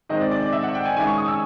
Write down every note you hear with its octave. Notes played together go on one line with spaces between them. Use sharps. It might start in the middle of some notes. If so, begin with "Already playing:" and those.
D#3 G#3 C4 D#5
D5
D5
D5
E5
F#5
G5
G#5
D#3 G#3 C#4 E4 G#5
C#6
D#6
E6